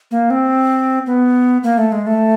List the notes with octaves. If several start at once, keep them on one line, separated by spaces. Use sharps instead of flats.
A#3
C4
B3
A#3
A3
G#3
A3